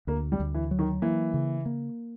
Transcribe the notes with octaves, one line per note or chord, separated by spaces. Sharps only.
D2 A#3
G3
D2
E3
F#3
D#3
E3 A#3
C#3
A#3